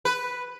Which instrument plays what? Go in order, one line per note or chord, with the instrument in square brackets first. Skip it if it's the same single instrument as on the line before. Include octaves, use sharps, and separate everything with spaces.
[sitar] B4